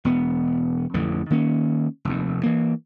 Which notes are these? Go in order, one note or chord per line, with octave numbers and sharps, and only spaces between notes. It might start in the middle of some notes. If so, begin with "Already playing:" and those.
E1 B3
A1 F2 D3 E3
D#3 A#3 C#4
F1 D#2
E3 A#3